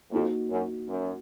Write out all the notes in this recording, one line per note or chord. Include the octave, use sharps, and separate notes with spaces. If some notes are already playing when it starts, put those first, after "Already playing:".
F2 A#3 D#4 F#4
F#2
F#2